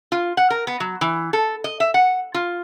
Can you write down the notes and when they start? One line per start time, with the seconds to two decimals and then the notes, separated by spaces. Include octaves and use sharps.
0.12 F4
0.37 F#5
0.50 A#4
0.67 B3
0.80 F#3
1.01 E3
1.33 A4
1.64 D#5
1.80 E5
1.94 F#5
2.34 F4